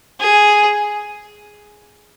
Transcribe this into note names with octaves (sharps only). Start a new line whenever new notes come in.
G#4